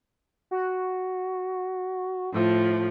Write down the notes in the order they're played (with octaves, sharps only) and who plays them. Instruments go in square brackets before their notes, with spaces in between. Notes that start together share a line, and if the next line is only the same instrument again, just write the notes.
[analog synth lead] F#4
[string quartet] A2 F3